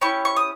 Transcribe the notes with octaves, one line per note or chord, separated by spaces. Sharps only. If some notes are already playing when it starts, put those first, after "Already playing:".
C#4 E4 G4 C#6
C#6
D#6